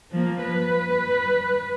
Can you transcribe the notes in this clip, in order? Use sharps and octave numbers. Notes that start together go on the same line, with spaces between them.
F3 A#3
B4